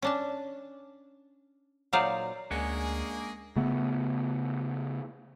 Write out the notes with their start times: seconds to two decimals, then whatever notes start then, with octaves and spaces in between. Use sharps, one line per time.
0.02 C#4 D4 A5
1.93 A#2 F#3 D#4 C5 D5 F5
2.51 D2 G#3 A#3 C#4 D4 G#4 F#5
3.56 C#3 A3 B3